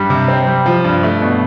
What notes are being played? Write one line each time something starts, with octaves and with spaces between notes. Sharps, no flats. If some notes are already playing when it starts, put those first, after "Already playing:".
Already playing: G2 G3
C3
C4
G3
F3
G2
A3
B2